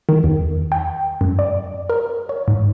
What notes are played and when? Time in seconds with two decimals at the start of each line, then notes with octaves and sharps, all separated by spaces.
0.09 D#3
0.24 E2
0.72 G5
1.21 F#2
1.39 D5
1.90 A#4
2.29 C#5
2.48 G#2